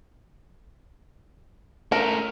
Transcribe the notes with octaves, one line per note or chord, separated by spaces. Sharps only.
A3 C#4 A#4